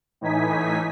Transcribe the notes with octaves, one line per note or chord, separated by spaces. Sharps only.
A2 E3 D#4 G#5 B6